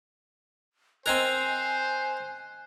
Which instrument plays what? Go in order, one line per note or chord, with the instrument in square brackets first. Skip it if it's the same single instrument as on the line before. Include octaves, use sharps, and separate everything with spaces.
[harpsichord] C4 D#4 A#4 [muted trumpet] C5 [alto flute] G#5 [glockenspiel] F#6 G#6 C7